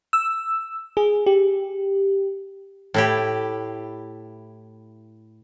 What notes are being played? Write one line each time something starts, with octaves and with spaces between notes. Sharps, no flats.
E6
G#4
G4
A2 E4 G4